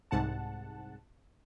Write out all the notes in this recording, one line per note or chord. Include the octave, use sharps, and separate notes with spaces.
C2 G#2 F#5 A5